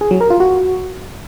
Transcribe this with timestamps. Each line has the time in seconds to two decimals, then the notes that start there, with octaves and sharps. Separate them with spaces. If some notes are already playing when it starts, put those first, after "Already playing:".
0.01 G#4
0.11 F#3
0.21 A#4
0.30 F4
0.40 F#4